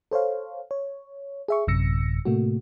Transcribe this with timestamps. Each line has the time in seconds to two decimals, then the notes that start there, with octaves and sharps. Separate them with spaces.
0.11 A4 C5 C#5 F5
0.71 C#5
1.48 G#4 E5 C#6
1.67 A1 F#2 C3 E6 A#6 C#7
2.25 A2 C3 A3 A#3 F#4